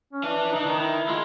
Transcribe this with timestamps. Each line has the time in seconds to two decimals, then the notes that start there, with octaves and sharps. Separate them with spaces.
0.13 C#4
0.24 E3 D4
0.52 D#4
0.56 E3 D4
0.66 D#3 D#4
0.80 E4
1.08 G#3 F4